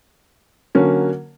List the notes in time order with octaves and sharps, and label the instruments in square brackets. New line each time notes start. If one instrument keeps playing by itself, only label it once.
[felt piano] D3 F#3 A#3 C#4